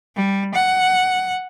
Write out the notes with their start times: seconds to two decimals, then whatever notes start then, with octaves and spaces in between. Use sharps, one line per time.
0.16 G3
0.55 F#5